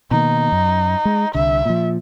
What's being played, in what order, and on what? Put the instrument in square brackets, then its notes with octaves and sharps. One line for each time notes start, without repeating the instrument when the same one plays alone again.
[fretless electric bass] B2 D#3 A#3 [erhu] D#4
[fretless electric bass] F#2
G#3
[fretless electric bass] C2 D3 [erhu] E5
[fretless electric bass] A#2 F3